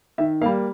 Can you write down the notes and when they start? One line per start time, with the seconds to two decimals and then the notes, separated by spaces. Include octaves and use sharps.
0.18 D#3 E5
0.41 A#3 F5
0.45 G3